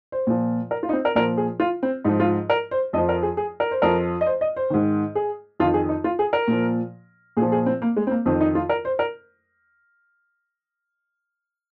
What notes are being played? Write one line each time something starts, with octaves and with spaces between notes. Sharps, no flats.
C5
A#2 F3
A#4
F4
D#4
C4
A#4
A#2 F3 A#4
G#4
F4
C4
G#2 F3 D#4
F4
A#4
C5
F2 F3 D#5
A#4
G#4
G#4
A#4
C5
F2 F3 A#4
D#5
C5
D#5
C5
G#2 D#3
G#4
F2 D#3 F4
G#4
D#4
F4
G#4
A#4
A#2 F3
A#2 G#4
F3
G#4
C4
A#3
G#3
C4
A#3
F2 D#3 C4
D#4
F4
A#4
C5
A#4